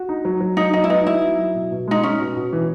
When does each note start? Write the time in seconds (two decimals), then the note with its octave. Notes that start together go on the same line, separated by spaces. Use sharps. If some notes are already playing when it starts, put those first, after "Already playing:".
Already playing: F#4
0.09 D#4
0.25 F#3
0.40 F#3
0.57 F#3 D#4
0.74 F#3 D#4
0.84 E4
0.90 B3 D#4
1.06 D#4 E4
1.22 F#3
1.39 F#3
1.55 B2
1.71 B2
1.88 G#3 D#4
2.03 C#4 D#4
2.20 B2
2.36 B2
2.53 E3